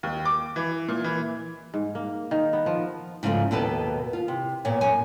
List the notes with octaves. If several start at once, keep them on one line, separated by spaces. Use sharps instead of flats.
D#2
D6
E3
A#2
E3
G#2
A#3
D#3
B3
F3
G#2 C#3 F3 G3 A3
D#2 B2 A4 B4 A5
F4
C3
E2 A#2 B3 C#5
F#2 G#5